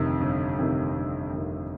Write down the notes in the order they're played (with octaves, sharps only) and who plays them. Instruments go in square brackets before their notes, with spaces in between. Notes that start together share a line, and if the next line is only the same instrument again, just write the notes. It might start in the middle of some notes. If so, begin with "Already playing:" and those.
Already playing: [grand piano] G1 F2 C3 D#3
G1
F2 C3 D#3
G1
F2 C3 D#3